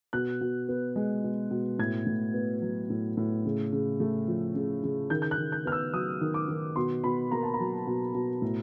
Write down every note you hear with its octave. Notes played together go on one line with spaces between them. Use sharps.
B2 F#6
B2
B3
G#3
B2
B2
A2 G#6
A2
B3
F#3
A2
A2
C#3
C#3
A3
F3
C#3
C#3
D#3 G6
G6
F#6
D#3
G6
B3 F6
E6
F#3 D#6
D#3
D6
D#3
B2 C6
B2 B5
A#3 A#5
A5
A#5
F#3
B2
B2
A2